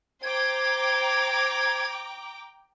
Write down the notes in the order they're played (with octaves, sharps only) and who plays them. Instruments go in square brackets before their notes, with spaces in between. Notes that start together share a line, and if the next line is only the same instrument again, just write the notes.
[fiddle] C5 [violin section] G5 A#5 D6 [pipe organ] G#6